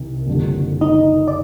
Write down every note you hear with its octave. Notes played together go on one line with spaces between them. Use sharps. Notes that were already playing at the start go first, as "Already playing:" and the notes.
Already playing: C2 C3 D#3
F#1 F2 D3 G3
D#4 D#5
D5